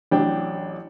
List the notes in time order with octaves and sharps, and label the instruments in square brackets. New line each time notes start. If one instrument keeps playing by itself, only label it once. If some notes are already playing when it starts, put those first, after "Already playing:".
[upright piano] A1 F#3 D4 G5